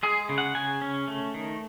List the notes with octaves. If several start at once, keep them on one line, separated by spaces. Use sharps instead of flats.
G#3 G#4
C#3
F#5
C#3 G#5
C#4
A3
D#3